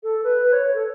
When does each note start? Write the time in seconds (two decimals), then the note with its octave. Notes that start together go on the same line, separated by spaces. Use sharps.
0.03 A4
0.24 B4
0.43 B4
0.53 C#5
0.74 A4